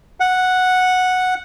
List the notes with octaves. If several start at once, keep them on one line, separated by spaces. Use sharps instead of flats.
F#5